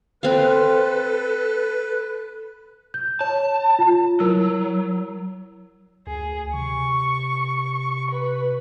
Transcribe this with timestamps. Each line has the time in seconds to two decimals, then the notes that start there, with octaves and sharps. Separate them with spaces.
0.23 C4 A4 B4 F5
2.94 G6
3.21 C#5 A5
3.79 F4
4.20 F#3 E4 A#4 E6
6.07 D2 G#4
6.54 C3 C#6
8.11 B4